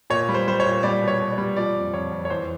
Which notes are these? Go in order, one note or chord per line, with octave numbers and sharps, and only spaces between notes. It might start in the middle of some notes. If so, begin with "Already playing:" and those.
A#2 C#5
G3
C5
G3 C5
C#5
A#2
G3 D5
B2
C#5
B2
D5
G3
F3 D5
F2
F2 C#5
F2
C#5
E2 C5